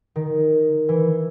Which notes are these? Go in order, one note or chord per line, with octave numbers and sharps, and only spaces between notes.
D#3
E3